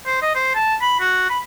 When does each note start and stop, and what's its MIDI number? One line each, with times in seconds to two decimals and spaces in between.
0.06 0.22 72
0.22 0.31 75
0.35 0.52 72
0.55 0.75 81
0.81 0.96 83
1.00 1.29 66
1.30 1.39 83